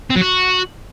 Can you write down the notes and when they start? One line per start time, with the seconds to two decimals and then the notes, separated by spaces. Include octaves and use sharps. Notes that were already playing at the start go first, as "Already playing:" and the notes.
0.10 C4
0.16 F#3
0.21 F#4